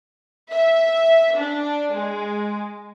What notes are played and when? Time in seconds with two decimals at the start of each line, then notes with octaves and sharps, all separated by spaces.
0.51 E5
1.38 D4
1.95 G#3